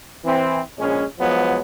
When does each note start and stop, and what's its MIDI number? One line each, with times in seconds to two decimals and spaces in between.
0.25 0.60 52
0.25 0.60 60
0.79 1.05 34
0.79 1.05 56
0.79 1.05 61
1.20 1.60 53
1.20 1.60 54
1.20 1.60 56
1.20 1.60 59